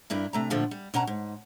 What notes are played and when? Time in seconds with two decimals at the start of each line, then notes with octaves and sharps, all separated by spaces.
0.10 G2 D4 E4 A#4
0.33 C3 A3 A#5
0.50 A#2 D3 F3 A3 F4 F#4
0.71 G3
0.94 B2 C#4 F#5 A5 A#5
1.07 G#2